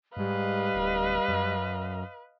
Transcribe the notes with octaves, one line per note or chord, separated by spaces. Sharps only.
G#2 G3 B4 D#5 F5
D1
F#2